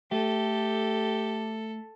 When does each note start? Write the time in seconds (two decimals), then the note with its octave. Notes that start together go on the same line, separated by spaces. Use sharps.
0.12 A3 G4 A4